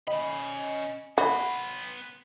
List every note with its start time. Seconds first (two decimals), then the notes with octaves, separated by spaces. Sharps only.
0.07 C#4 D#5 B5
1.18 B3 F#4 B5 C6